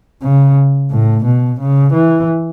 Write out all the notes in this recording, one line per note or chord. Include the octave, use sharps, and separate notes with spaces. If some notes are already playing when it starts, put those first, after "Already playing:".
C#3
A2
B2
C#3
E3